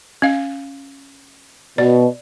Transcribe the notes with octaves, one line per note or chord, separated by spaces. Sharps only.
C#4 F5
B2 D5